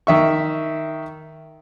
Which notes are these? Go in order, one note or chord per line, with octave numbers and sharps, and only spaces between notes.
D#3 E5 C#6